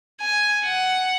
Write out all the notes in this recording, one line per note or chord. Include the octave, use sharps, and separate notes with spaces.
G#5
F#5